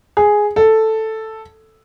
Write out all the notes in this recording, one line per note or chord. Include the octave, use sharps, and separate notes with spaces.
G#4
A4